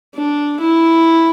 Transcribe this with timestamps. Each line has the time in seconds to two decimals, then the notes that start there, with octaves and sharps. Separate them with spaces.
0.15 D4
0.60 E4